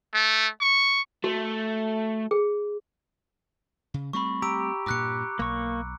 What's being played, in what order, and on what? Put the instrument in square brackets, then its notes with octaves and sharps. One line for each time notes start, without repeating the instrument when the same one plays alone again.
[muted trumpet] A3
C#6
[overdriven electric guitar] A3 [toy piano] F#4
[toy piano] G#4
[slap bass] C#3
[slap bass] G3 A3 C4 [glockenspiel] B5 C#6
[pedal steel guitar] G4 [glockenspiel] A#5 E6 D7
[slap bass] G2 A#2 [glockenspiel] D6 F#6 C#7
[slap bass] B1 [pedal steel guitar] A#3 C#6